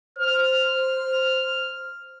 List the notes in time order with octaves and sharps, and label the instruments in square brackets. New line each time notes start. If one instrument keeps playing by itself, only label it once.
[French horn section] C5 [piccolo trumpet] F6